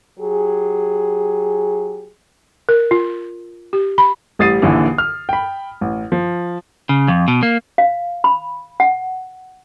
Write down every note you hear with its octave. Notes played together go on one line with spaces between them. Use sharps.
F#3 G4 G#4
A#4
F4
G4
B5
A1 G3 D#6 A6 C7 D#7
A#1 D#2 A#2 D3 E3
F6
G5 B5
A1
F3
C#3
F2
B2
A#3
F5
B5
F#5